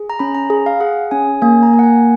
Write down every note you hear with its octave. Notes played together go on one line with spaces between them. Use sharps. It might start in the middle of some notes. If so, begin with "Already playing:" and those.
Already playing: G#4
A#5
C#4 B5
A#5
G#4
F5
G#4 F#5
C#4 G#5
A#3 G#5
A#5
A#3
F#5
G#5